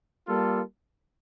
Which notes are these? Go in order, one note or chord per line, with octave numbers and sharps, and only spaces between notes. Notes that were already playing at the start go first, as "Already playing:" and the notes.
G3 A#3 F4 A4